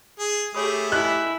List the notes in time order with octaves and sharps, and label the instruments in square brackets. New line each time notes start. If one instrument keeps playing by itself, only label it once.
[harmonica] G#4
[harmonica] A3 G4 [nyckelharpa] G#4 [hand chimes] C#5 B5 D#6
[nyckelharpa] E4 [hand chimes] D#5 G#5 B5 [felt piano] F#6